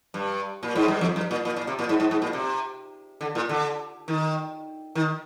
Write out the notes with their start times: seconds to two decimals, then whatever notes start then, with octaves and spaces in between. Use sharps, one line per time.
0.14 G2
0.63 A#2
0.76 G#2
0.88 G2
1.01 F2
1.16 G2
1.31 A#2
1.45 A#2
1.56 A#2
1.67 C3
1.79 A#2
1.89 G#2
2.00 G#2
2.11 G#2
2.22 A#2
2.33 C3
3.21 D3
3.35 A#2
3.49 D3
4.08 D#3
4.95 D#3